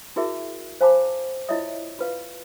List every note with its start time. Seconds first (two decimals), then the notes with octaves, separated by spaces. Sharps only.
0.16 E4 F#4 G#4 A#4 E5
0.81 C5 F5 G#5 A5 B5 D6
1.48 E4 F4 C#5 D#5 E5 D#6
1.99 F4 B4 F5